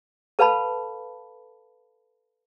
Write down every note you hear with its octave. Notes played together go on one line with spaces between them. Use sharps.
A4 B4 F5 A5 B5